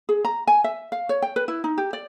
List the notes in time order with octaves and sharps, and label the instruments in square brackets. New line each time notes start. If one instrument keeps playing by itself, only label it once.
[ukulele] G#4
A#5
G#5
E5
F5
C#5
G5
B4
E4
D#4
G4
D5